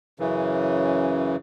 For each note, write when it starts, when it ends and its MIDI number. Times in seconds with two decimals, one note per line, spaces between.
0.20 1.36 42
0.20 1.36 49
0.20 1.36 52